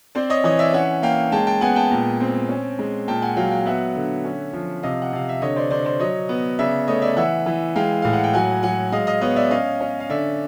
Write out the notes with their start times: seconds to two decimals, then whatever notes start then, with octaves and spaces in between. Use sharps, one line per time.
0.15 C4 C5 D5
0.30 C#5 D#5
0.44 E3 C#5 D#5
0.59 D5 E5
0.73 C#4 E5 F#5
1.02 A#3 F5 G5
1.32 G#3 G5 A5
1.47 G5 A5
1.61 B3 F#5 G#5
1.76 G5 A5
1.91 A#2
2.21 C4
2.49 C#4
2.79 G#3
3.08 A#2 G5 A5
3.22 F#5 G#5
3.37 F#3 F5 G5
3.51 F5 G5
3.66 B3 E5 F#5
3.96 D3
4.25 C#4
4.53 F3
4.83 C3 D#5 F5
5.02 F#5
5.13 C3 F5
5.29 E5
5.41 D3 C#5 D#5
5.56 C5 D5
5.71 D3 C5 D5
5.85 C5 D5
6.00 F#3 C#5 D#5
6.29 B3
6.59 C#3 D5 E5
6.88 A3 C#5 D#5
7.02 D5 E5
7.17 E3 E5 F#5
7.46 E3
7.76 G#3 F5 G5
8.02 A2 F5
8.13 F#5
8.24 G5
8.33 F#3 F#5 G#5
8.63 F#3 F#5 G#5
8.92 G#3 D#5 F5
9.07 D#5 F5
9.21 B3 C#5 D#5
9.36 D5 E5
9.50 C#4 D#5 F5
9.81 C#4
10.00 F5
10.09 D3 D5 E5